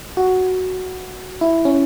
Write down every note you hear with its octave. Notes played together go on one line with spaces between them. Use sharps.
F#4
E4
C#4